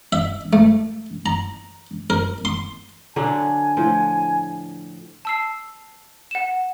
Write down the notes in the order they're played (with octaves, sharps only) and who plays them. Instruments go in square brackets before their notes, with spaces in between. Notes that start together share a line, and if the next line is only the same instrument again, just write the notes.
[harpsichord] E5
A3
A#5
A#4
C6
[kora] D3 F#3 D4 [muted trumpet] G#5
[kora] A2 F3
[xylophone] A5 E6 C7
F#5 E7